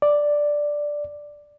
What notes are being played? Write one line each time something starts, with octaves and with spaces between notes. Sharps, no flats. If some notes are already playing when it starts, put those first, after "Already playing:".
D5